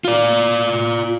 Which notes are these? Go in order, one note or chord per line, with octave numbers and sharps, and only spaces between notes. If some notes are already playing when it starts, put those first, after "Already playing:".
F4 D5